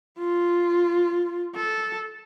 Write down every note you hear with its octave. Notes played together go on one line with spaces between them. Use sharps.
F4
A4